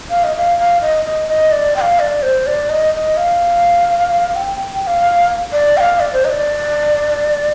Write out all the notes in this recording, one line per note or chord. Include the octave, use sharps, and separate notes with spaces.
F5
D#5
F5
F5
D#5
D#5
D#5
D5
G5
F5
D5
C5
D5
D#5
D#5
F5
G5
G5
F5
D5
G5
F5
D5
C5
D#5
D5